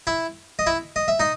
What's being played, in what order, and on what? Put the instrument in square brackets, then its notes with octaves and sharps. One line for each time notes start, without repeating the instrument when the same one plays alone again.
[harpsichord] E4 E5
D#5
E4 E5
D#5
E5
D#4 D#5